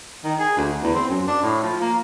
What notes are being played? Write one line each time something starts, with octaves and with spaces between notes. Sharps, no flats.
D#3
G#4
D2
E2
C4
F#2
D4
A2
F3
A#3